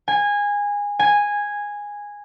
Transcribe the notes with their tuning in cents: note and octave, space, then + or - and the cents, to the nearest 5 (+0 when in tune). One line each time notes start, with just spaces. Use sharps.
G#5 -20
G#5 -10